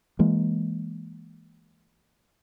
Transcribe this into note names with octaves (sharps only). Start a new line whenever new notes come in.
E3 G#3 A#3